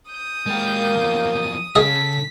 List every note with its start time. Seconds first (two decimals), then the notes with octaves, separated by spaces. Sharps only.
0.10 D#6 G6
0.46 D#2 G#3 A#3 G5
0.96 E2 F3
1.31 D#6
1.76 C#3 G#4 A4 D#5 B6